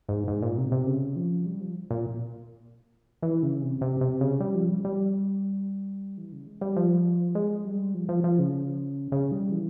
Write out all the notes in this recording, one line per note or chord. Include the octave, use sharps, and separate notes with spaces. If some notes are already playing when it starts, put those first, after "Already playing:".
G#2
G#2
A#2
C3
C3
C#3
F3
G3
F3
A#2
E3
C#3
C3
C3
C3
C#3
G3
F3
G3
G3
E3
C#3
G#3
G3
F3
G#3
G3
F3
F3
F3
C#3
C#3
G3
E3